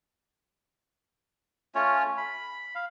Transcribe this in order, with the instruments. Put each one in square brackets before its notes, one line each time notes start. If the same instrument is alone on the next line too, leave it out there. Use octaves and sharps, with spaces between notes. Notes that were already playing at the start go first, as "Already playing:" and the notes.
[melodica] A3 C#4 F4 C#5
B5
F5